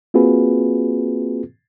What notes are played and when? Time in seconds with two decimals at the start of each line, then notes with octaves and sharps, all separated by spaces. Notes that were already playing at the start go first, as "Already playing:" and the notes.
0.14 A#3 C4 F4 F#4 G#4 B4